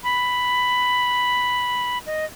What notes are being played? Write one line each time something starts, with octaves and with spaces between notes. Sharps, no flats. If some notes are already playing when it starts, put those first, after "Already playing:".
B5
D#5